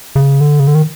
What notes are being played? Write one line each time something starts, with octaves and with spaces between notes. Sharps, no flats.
C#3
D3
C#3
D3
D#3